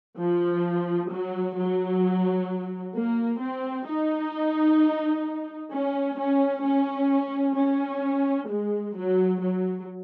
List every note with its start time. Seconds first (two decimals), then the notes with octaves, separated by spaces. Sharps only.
0.19 F3
1.11 F#3
1.57 F#3
2.96 A#3
3.41 C4
3.88 D#4
5.73 C#4
6.19 C#4
6.65 C#4
7.57 C#4
8.50 G#3
8.96 F#3
9.42 F#3